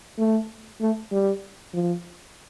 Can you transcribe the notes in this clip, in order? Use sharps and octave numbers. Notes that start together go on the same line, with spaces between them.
A3
A3
G3
F3